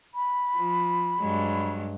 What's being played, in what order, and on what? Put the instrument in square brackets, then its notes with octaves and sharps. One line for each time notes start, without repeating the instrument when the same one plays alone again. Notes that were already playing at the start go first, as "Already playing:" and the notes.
[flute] B5
[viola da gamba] F3
G2 F#3 G#3